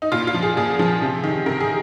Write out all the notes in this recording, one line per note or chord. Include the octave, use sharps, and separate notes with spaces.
D#4
A#2 F4
F4
F3
G#4
A#2 G#4
F3
C3
D#3
C3 A#4
G#4